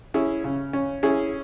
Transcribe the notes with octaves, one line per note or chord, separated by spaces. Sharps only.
C#4 E4 G#4
C#3
C#4
C#4 E4 G#4